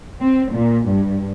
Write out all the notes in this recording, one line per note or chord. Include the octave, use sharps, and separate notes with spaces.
C4
A#2
G2